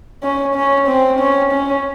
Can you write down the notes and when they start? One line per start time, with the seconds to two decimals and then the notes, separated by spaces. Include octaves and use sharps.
0.23 C#4
0.56 C#4
0.88 C4
1.20 C#4
1.52 C#4